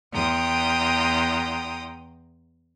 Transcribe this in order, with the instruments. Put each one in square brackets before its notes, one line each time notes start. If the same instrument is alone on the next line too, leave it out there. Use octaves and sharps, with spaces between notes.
[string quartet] E2 G5 A#5 C6 D#6